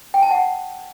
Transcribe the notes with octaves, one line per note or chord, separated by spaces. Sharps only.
G5
A5
F#5